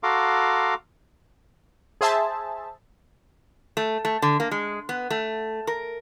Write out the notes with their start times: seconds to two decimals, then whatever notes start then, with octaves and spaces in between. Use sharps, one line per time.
0.03 F#4 A4 F5 A#5 C6 D6
2.01 G#4 C5 E5 A5
3.77 A3
4.05 A3
4.22 D3
4.40 A#3
4.51 G#3
4.89 B3
5.10 A3
5.67 A#4